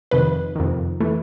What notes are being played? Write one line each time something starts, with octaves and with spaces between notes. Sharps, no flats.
F2 C3 D#3 B4
F2 C3 D#3
E3 A3